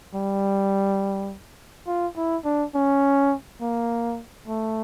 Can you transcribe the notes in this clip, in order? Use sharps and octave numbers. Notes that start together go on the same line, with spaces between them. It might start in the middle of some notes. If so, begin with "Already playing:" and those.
G3
F4
E4
D4
C#4
A#3
A3